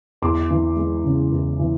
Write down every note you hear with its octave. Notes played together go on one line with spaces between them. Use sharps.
E2 C6 D6
E3
G#3
C#3
E2
E3